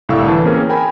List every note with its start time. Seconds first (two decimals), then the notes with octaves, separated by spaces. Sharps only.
0.09 C2 A2 D3 F5 C#6 E6
0.28 E3 A5
0.45 A#3 C4 C#4 G#4 A#4
0.69 A#4 G5 G#5 B5